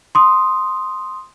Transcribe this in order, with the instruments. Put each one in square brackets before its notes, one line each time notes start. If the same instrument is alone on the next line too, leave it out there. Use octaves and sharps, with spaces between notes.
[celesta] C6 D#6